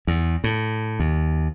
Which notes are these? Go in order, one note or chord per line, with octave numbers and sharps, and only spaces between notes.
E2
A2
D#2